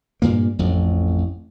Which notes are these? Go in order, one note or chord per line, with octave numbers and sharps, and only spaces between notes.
G2 A#2 A#3
A1 F2